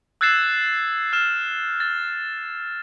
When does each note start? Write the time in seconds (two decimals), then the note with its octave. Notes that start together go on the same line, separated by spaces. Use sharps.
0.21 E6 F#6 G#6 A6 C7 E7
1.13 F6 E7
1.80 A6